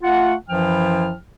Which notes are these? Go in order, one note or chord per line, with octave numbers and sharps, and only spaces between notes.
A3 F4 F#5
F#2 E3 F3 E4 G5 F6